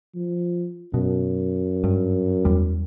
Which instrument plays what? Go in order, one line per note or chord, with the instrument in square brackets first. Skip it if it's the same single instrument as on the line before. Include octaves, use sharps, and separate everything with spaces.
[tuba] F3
[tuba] F#2 [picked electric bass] B2
[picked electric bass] G2
E2 G3